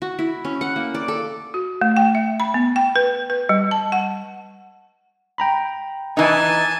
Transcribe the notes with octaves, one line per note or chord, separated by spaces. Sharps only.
F#4
E4
C#4
F#5
A#3
D5
A4
F#4
A3
G5
E5
B5
B3
G5
B4
B4
G3
A5
F#5
G5 A#5 B5
E3 D#4 G#5 A5